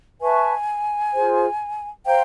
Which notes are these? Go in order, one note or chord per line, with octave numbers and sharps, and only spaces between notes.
B4 E5 G#5 A5 C#6
F4 G#4 C5
C5 F5 G5 A#5